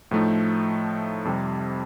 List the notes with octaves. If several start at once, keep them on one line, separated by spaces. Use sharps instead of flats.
A2 F3 A3 D#4
F2 C3 G3